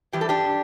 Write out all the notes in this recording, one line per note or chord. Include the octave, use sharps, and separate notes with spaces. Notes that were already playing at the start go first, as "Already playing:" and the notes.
A2 E3 G3 C4 G4
A4
D4 G4